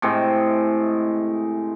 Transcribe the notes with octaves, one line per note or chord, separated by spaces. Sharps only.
A2 C3 G#3 G5